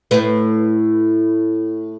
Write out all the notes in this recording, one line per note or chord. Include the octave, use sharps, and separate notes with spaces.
A2 B4